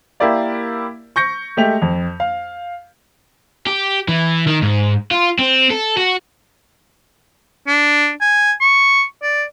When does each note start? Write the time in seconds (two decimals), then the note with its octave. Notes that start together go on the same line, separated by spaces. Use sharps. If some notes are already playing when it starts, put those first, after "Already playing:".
0.20 A#3 E4 G4 A#4 D5 F5
1.16 C#6 G6 A#6 C#7
1.57 G#3 A3 G4 E5 F7
1.82 F2
2.20 F5
3.66 G4
4.08 E3
4.47 D#3
4.62 G#2
5.11 F4
5.39 C4
5.70 A4
5.97 F#4
7.67 D4
8.21 G#5
8.61 C#6
9.22 D5